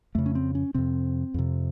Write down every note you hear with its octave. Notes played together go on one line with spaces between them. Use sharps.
F2 C#3 A3
C#4
C4
C#4
F2 C3 C4
F2 C3